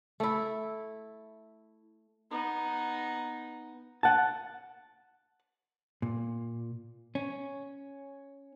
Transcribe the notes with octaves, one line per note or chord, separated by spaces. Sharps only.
A3 E4
B3 D#4
F#5 A5
A#2
C#4